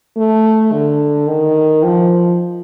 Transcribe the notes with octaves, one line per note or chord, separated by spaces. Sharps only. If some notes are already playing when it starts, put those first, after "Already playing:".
A3
D3
D#3
F3